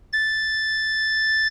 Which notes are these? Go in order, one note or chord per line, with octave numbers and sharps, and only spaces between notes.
A6